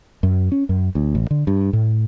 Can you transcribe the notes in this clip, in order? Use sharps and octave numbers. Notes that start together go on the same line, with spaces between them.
F#2
C#4
F#2
D2
A1
D3
G2
A2